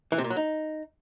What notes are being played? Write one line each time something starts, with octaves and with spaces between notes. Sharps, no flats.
E3
C3
A#2
F#3
D#4